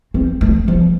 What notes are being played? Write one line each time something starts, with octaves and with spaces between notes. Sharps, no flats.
C4
A3
F3